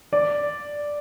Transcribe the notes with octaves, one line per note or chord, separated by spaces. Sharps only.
D5